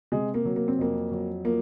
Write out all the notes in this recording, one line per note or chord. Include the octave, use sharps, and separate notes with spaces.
C3 G#3
A#3
F#3
A#3
C4
F2 A#3
F#3
F3 A#3